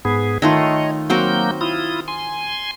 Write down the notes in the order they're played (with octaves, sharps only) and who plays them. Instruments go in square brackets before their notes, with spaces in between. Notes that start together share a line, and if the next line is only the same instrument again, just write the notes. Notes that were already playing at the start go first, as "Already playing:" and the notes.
[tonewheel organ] G#2 B3 G#4
[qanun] D#3 A3 F4 [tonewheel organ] C#5 D#5
[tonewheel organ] F#3 A#3 G6 [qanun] C4 F#4 A#4
[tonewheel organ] E4 F4 D#6
G#5 C6